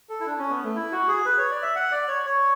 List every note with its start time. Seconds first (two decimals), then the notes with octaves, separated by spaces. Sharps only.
0.09 A4
0.20 E4
0.26 D4
0.39 C#4
0.51 B3
0.64 A3
0.76 E4
0.92 F#4
1.08 G#4
1.25 B4
1.38 C#5
1.51 D5
1.62 E5
1.75 F#5
1.92 D5
2.08 C#5
2.26 C#5